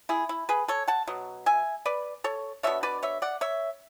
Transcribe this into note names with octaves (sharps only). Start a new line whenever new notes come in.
E4 G#4
E4
G#4 B4
A4 C#5
F#5 A5
B2 F#3
E5 G#5
B4 D5
A4 C#5
B2 G#3 D4 C#5 E5
B4 D5
C#5 E5
D5 F#5
C#5 E5